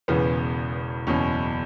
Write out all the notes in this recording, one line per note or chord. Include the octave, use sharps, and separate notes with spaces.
E1 E2 C#3 E3 B3
F#1 E2 B2 C#4